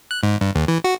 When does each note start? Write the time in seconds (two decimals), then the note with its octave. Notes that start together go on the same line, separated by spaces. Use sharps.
0.11 F#6
0.23 G#2
0.41 G2
0.55 D#2
0.68 E3
0.84 F#4